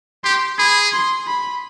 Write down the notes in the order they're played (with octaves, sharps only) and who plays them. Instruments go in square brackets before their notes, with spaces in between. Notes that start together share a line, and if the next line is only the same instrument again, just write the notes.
[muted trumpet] G4 [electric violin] C6
[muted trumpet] G#4 [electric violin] B5
[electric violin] C6
B5